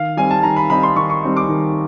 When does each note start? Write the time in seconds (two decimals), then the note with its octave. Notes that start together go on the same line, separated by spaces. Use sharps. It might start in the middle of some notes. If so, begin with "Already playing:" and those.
Already playing: D#3 F5
0.17 G3 C4 D#4 G#5
0.31 A5
0.43 D#3 A#5
0.56 B5
0.70 G3 C4 D#4 B5
0.83 C6
0.96 D#3 C#6
1.10 C#6
1.23 G3 C4 D#4
1.37 D6
1.49 D#3